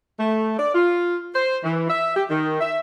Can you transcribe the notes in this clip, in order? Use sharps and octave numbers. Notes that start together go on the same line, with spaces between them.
A3
D5
F4
C5
E3
E5
G4
D#3
E5